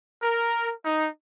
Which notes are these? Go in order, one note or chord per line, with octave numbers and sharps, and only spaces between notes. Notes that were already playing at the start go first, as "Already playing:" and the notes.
A#4
D#4